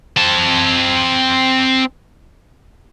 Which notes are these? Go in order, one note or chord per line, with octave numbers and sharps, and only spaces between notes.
C4 A5